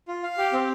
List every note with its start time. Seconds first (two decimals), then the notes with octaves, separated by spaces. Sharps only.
0.08 F4
0.23 F5
0.38 G4
0.53 C4